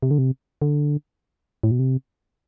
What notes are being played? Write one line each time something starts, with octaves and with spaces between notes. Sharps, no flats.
C3
D3
C3
D3
A2
B2
C3